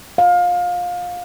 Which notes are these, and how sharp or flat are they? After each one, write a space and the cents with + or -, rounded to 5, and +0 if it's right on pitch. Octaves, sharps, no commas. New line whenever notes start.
F5 +25